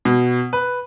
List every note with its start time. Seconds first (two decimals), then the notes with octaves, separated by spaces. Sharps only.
0.05 B2
0.53 B4